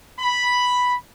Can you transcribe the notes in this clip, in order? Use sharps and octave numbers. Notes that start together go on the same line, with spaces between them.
B5